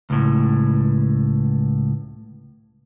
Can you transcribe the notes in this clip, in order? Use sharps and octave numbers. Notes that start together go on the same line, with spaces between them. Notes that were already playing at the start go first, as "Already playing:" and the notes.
C#2 A2